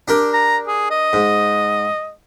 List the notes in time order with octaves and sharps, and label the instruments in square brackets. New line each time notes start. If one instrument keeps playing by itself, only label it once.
[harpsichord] D4 G4 A#4
[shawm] A#5
G#4
D#5
[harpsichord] G#2